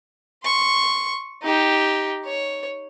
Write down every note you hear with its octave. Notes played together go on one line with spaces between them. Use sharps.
C6 C#6
D#4 G4
C#5